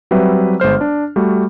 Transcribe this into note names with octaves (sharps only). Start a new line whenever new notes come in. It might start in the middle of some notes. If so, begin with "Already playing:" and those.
F#3 G3 C4 B4 E5
G1 G#3 C5 F6
D4
G3 A3 F#4